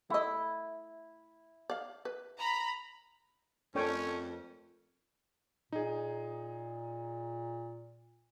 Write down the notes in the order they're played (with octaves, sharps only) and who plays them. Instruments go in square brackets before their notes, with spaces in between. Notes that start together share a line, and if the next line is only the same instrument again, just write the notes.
[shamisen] A3 D#5 [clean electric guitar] E4
[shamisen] D5 F5
B4
[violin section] A#5 B5
[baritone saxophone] F2 [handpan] A3 A4 A#4 [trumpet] C#4 [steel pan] D4 C#5 G5
[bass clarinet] A#2 [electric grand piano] D#4 G#4